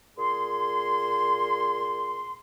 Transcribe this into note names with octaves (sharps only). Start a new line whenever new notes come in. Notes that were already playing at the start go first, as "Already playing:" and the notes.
A#2 G#4 C6